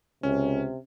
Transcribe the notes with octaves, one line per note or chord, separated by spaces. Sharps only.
C#2 C3 C#4